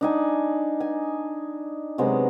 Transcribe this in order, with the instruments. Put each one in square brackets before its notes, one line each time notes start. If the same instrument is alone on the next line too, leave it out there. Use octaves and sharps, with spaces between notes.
[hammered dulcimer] D4 D#4 G#5 C#6
G#5
C3 F#3 G#3 B3